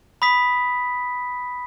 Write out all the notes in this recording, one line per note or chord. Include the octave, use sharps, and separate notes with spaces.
B5 D#6 B6